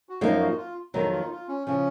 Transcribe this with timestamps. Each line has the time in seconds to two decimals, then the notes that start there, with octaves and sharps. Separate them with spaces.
0.09 F#4
0.21 F#2 F3 A#3 D#4 F4
0.40 F#4
0.57 F4
0.94 F2 D#3 F#3 B3 D#4
1.12 F4
1.21 D#4
1.31 F4
1.48 C#4
1.67 C#3 F3 C#4